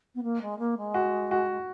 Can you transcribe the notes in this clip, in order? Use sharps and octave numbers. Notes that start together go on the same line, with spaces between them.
B3
A#3
G#3
A#3
G#3
F#4
F#4